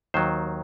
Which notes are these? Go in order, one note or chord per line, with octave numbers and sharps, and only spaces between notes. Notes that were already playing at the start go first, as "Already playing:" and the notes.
D#2 D#3 F#3 C5